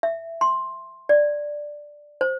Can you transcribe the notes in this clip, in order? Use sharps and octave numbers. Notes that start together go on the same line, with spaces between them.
E5
C6
D5
C5